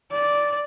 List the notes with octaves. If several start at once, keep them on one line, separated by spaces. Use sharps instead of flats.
D5